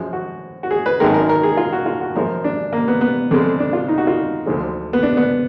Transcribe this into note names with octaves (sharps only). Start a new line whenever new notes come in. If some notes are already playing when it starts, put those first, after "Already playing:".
Already playing: F#2 F3 G#3
F#4
F#4
G#4
B4
G#1 F#2 D#3 G#3 A#4
A#4
A#4
G#4
F4
F#4
F4
F#4
F#2 F3 G#3 A#4
D4
A#3
B3
B3
F2 D3 G#3
D4
F4
D#4
F#4
F4
D#4
D2 D3 F3 G#3
B3
D4
B3